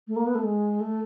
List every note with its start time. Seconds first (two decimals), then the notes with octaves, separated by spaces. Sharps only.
0.08 A3
0.16 A#3
0.26 B3
0.35 A3
0.43 G#3
0.80 A3